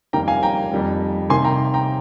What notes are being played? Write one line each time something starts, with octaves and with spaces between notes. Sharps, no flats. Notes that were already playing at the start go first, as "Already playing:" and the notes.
F2 D#3 G3 A#3 G5 A#5
F5 G#5
G5 A#5
F2 D#3 G3 A#3
C3 D#3 A#3 G#5 C6
G5 A#5
G5 A#5